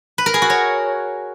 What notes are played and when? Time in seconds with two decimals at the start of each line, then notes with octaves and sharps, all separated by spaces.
0.18 B4
0.26 A#4
0.34 G#4
0.42 F#4
0.50 C#5